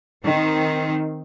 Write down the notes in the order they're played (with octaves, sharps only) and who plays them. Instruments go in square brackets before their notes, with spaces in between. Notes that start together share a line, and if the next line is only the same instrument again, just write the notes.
[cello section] D#3 C4